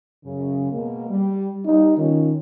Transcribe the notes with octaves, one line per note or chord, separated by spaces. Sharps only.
F#2 C#3
B2 G#3 A#3
G3
G3 D#4
D#3 C#4 F4